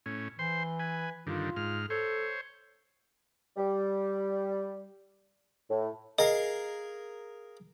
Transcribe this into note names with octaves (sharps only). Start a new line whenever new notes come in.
A2 C#4
E3 C5 C6
B4 G#5
G2 D3 D#3 F4
G#2 F6
A4 C5 C#5
G3
A2
G#4 A#4 D#5 F5